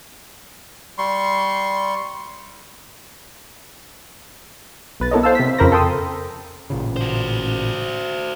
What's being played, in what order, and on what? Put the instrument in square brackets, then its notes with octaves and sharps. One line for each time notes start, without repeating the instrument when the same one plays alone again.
[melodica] G3 C6 C#6
[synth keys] B1 B4 A6
B3 E4 A4 A#4 C#5 D#5
C5 F5 A5 E6
C3 B6
F2 C#3 A#4 C5 B5 A#6
A4 A#4 G5 C6 D#6 E6
[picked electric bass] A1 A#2 C#3
[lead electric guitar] F#4 C5